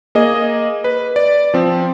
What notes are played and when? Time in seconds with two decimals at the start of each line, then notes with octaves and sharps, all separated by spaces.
0.15 A#3 G#4 D#5
0.84 B4
1.16 D5
1.54 F3 C4